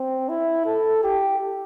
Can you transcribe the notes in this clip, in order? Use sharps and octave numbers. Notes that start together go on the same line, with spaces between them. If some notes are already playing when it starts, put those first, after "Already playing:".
Already playing: C4
E4
A4
G4